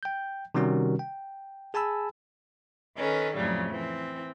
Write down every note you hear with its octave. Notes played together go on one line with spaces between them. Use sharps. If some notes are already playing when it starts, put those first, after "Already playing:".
G5 G6
C3 D#3 G3 C#4 F#4 A#4
G5
G#4 G#5 A5 B5 E6
D#3 C#4 A4 B4
F2 A2 C#3 F#3 G3
E3 C4